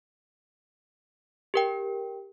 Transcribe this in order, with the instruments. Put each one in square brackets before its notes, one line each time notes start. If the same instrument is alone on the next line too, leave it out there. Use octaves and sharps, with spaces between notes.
[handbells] G4 A#4 G5